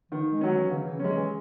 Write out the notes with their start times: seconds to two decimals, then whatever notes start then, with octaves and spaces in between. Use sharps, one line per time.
0.12 D#3 E3
0.32 G#3
0.41 F#3 C#4
0.51 E3
0.71 C#3 E3
0.85 E3
0.99 F#3 G#3 C#4
1.15 E3